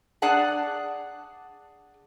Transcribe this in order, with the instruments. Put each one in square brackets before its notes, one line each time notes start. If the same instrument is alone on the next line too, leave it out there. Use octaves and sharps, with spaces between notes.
[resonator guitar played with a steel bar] D4 G#4 D5 F#5 A5